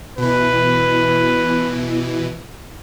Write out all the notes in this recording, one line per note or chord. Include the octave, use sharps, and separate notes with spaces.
B2 E3 B4